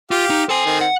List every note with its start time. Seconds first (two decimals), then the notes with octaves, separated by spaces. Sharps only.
0.11 F4 G4 F5
0.30 D#4
0.49 C4 A4 G#5
0.66 D#3 C4
0.81 F#5